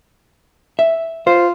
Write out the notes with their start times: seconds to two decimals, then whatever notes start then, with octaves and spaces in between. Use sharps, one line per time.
0.79 E5
1.27 F4 C5